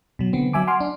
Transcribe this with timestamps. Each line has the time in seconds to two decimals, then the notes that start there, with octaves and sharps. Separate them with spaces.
0.19 B2 F#3
0.33 D3 B3 C4
0.53 F#3 E5 G#5 D6
0.67 F#5 G#5 C6 D6 F6
0.80 D4